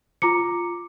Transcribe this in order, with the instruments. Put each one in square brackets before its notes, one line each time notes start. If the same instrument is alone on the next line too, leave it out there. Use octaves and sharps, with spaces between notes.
[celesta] F4 A#5 D6 C#7